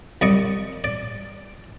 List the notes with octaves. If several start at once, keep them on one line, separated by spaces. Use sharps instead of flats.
C2 D5 D#5 C#6
D5